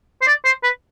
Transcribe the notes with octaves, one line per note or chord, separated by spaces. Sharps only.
C5
D5
C5
B4